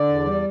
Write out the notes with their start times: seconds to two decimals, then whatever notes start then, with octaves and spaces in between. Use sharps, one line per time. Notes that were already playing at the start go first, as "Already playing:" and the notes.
Already playing: D3 D5
0.09 E2
0.25 G3